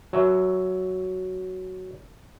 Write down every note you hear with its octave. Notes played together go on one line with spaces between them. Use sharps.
F#3 E5